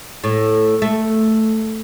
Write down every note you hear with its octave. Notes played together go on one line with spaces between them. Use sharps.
A2
A3